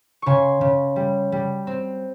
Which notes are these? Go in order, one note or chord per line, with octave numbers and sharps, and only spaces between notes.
C#3 G#5 C6 C#6
C#3
G3
G3
C4